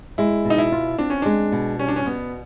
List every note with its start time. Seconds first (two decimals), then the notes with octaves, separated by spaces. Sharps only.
0.18 G#3 E4
0.45 B2
0.50 D#4
0.58 E4
0.72 F4
0.98 C4 D4
1.10 C#4
1.22 G#3 D4
1.52 B2
1.79 G3 C#4
1.88 D4
1.96 C#4
2.06 B2 B3